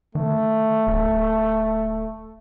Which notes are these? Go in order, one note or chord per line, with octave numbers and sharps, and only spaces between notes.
D#3 A3
D1